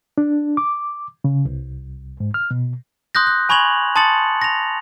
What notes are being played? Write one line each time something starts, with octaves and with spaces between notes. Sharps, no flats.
D4
D6
C#3
C2
G#2
F6
B2
C6 D#6 F#6 G6 A#6
F#6
G#5 B5 C#6 G#6 F7 F#7
A5 C6 D#6 A6 C#7 F#7
A#6 F7